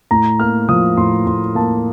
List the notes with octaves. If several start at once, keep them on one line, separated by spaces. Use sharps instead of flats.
A2 A#5
A#3 F6
F3 D#6
A2 C6
A2 C6
A#3 A5